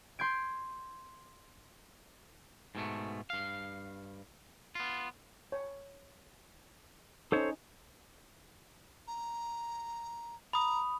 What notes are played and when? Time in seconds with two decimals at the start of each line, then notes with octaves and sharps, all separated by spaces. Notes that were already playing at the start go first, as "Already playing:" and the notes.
0.19 C6 G6 G#6 D7
2.75 G#2 B2 A3
3.30 G2 F5
4.75 B3 F4
5.52 C#5
7.32 C#4 D#4 A4 C5 C#5
9.07 A#5
10.53 A#5 B5 D#6